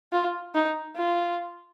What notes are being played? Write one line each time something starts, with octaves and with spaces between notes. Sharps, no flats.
F4
D#4
F4